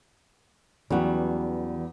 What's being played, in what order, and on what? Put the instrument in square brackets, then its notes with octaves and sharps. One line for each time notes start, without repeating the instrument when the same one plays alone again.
[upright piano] E2 [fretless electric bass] E3 F#3 C#4 [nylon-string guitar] G3 B3 F#4